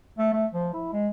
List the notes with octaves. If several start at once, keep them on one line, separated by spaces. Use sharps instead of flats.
A3
A3
F3
E4
G#3